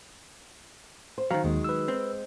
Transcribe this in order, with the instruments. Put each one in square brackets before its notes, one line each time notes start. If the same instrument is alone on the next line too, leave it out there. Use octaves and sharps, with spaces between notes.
[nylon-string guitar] C5
[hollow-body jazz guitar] D#3 F#3 [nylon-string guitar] C4 [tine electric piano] F5 A#5
[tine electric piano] D#2 [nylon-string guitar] G#3
[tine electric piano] B4 E6
[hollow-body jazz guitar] C4